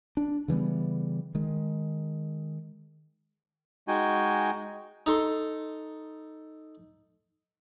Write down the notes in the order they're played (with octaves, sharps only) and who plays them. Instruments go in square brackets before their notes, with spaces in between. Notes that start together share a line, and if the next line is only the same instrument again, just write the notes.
[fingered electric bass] D4
C#3 E3 G3 B3
D#3 G#3
[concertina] G#3 D#4 F#4 G5 G#5
[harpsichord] D#4 A4 C6